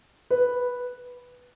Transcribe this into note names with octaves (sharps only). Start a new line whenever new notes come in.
B4